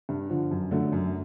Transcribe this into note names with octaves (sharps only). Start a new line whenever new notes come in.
G2
D3 F3
F#2
D3 F#3 A3
F#2